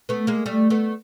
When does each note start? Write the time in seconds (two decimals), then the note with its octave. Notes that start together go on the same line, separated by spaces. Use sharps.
0.09 A3 B3
0.27 G#3 A#3
0.46 G3 A3
0.70 A3 B3